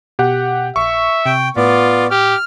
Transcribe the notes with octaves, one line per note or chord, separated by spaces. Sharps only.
B2 G4 F#5
A#1 E5 C#6
C3 G5
A2 B3 F4 D5
G4 F6